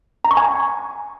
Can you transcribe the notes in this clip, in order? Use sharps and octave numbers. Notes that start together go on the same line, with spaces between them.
A#5
C#6
G#5